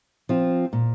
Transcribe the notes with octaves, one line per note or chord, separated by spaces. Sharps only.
F3 C4 F4
A#2